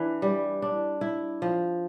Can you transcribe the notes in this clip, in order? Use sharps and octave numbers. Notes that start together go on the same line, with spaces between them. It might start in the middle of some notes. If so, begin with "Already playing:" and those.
Already playing: E3 D4
G3
D4
E4
F3